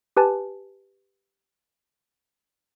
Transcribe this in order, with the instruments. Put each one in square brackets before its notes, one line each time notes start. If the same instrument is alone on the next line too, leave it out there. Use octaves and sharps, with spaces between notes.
[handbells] G4 B4 G#5 A5